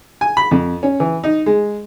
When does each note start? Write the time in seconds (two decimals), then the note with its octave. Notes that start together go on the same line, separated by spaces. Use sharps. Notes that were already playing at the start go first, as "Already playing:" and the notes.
0.21 G#5
0.37 B5
0.51 F2
0.83 C#4
1.00 E3
1.24 D#4
1.46 G#3